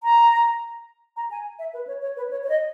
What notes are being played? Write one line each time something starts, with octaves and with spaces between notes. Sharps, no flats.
A#5
A#5
G#5
E5
B4
C#5
C#5
B4
C#5
C#5
D#5